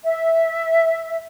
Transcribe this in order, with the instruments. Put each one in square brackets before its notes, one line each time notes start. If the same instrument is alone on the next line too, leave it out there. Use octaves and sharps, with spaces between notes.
[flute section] E5